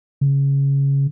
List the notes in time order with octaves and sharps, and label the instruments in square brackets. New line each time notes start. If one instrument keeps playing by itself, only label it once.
[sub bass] C#3